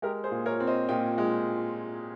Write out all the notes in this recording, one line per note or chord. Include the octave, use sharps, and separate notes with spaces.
G#3 G4 A#4
G#4 C5
A#2
A#4 C#5
C4
C5 D#5
A#2 D#5 G5
G#3